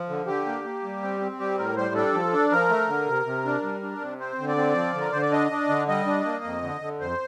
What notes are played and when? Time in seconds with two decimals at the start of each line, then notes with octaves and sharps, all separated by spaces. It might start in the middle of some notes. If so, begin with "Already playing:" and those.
Already playing: F3
0.09 D3
0.27 D3 G4
0.46 A#3
0.64 A#3
0.83 G3
1.02 C4
1.21 C4
1.39 G3 G4
1.58 A2 A#4
1.76 G3 C5
1.95 D4 A4
2.14 F3
2.33 D4
2.51 F3 A#4
2.69 A3
2.88 D3
3.07 C3
3.26 C3
3.45 D4
3.63 G3
3.83 D4
4.01 C3
4.20 C4 C5
4.39 D3
4.48 D5
4.57 C4
4.75 F3
4.94 D3
5.01 A#4
5.12 D3 C5
5.22 D5
5.31 D4 D#5
5.51 D4
5.69 D3
5.88 G3 D#5
6.06 D4
6.25 A#3
6.44 F2
6.63 D3
6.81 D3
7.00 F2 C5